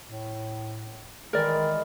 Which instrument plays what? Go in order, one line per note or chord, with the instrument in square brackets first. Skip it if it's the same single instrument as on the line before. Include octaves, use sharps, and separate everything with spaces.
[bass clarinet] A2
[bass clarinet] D#3 [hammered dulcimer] E3 G#3 [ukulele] A#4 D5